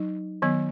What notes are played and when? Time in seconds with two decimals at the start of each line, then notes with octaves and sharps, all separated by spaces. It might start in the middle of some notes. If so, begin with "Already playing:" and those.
Already playing: F#3 D#4
0.42 D#3 F#3 B3